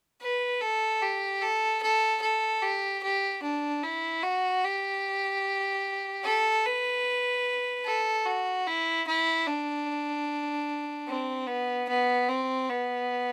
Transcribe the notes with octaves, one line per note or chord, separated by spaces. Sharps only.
B4
A4
G4
A4
A4
A4
G4
G4
D4
E4
F#4
G4
A4
B4
A4
F#4
E4
E4
D4
C4
B3
B3
C4
B3